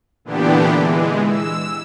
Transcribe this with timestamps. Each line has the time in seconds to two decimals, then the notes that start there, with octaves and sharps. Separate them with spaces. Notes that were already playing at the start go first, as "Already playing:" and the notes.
0.25 A#2 D3 E3 B3 D4 G4
0.77 E3 G#3
1.28 E6